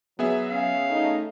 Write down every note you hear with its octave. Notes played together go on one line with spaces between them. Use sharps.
F#3 B3 G#4 E5
C#4 F5
A3 D#4